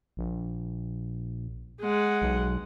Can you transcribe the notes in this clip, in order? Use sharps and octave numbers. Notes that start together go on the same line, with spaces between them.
A#1
G#3 F#5
B1